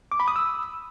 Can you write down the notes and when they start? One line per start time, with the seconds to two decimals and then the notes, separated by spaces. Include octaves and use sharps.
0.12 D6
0.20 B5
0.28 D#6
0.36 E6